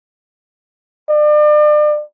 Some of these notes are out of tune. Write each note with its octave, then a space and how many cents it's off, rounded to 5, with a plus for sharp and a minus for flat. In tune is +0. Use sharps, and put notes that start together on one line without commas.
D5 +35